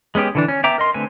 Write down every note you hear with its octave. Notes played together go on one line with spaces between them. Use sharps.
G#3 B3 C#4 G4
D3 E3 D4
C#4
B3 E5 G5 A#5 D6
A#4 D#5 C6
D3 A3 C4 B4 G#5